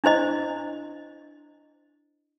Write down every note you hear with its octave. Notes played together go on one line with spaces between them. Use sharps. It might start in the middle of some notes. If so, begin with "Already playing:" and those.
D4 E4 C5 D#5